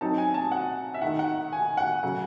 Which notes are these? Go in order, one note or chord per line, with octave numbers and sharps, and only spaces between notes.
F#3 C4 D#4 A5
G#5
A5
F#5
E5
D#3 A3 D#4 F#5
F#5
G#5
F#5
C#3 F#3 A3